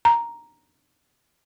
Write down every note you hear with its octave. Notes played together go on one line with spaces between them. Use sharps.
A#5